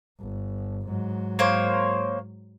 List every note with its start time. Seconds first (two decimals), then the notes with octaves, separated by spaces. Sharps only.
0.20 G1
0.87 G#2 F#3
1.39 A#3 C5 C#5